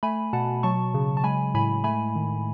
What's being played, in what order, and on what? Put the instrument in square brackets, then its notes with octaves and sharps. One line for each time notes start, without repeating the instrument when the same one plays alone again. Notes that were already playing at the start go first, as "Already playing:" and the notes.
[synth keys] A3 G#5 B5
B2 F#5 A5
F#3 A5 C#6
C#3
A5
G#3 G#5 B5
A2 G#5 B5
A3 G#5 B5
D#3